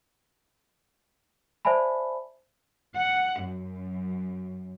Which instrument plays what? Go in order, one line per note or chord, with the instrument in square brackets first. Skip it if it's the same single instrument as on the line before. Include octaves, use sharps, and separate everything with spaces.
[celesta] C5 D5 E5 G#5 A5 B5
[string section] F#5
F#2